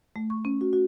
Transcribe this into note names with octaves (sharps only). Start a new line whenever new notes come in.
A3
C#6
C#4
F#4
F#4